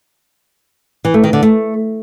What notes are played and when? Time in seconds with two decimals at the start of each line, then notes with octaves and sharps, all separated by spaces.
1.05 E3
1.14 A3
1.24 D#3
1.33 D3
1.43 A3